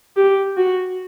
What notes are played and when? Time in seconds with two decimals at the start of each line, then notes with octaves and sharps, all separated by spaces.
0.16 G4
0.57 F#4